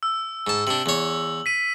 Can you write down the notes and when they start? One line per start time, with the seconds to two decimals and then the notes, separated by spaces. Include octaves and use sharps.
0.03 E6
0.47 G#2 A5
0.67 C3 D4 F#7
0.86 E2 C#5
1.46 B6 D#7